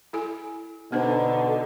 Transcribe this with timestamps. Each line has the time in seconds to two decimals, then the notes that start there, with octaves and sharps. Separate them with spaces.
0.13 E4 A4 G#5
0.92 B2 D3 B3 D4 D#4 C5